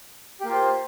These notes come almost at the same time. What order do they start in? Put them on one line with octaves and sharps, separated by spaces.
G4 A#3 F4 C5